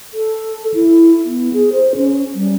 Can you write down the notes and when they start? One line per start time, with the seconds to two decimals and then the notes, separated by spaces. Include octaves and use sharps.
0.14 A4
0.74 E4
1.25 B3
1.53 G#4
1.73 C5
1.96 C#4
2.35 G3